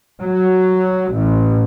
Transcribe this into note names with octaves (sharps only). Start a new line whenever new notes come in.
F#3
A1